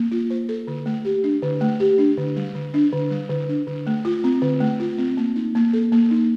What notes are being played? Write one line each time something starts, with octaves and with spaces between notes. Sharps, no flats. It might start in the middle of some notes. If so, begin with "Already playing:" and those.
Already playing: A#3
F4
C5
A4
D3
A3
G4
D4
D3
A3
G4
D4
D3
G3
D3
D4
D3
G3
D3
D4
D3
A3
F4
C4
D3
A3
F4
C4
A#3
D#4
A#3
A4
A#3
D#4